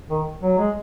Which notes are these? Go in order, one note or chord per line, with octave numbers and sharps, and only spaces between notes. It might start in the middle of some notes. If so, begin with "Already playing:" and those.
D#3
F#3
G#3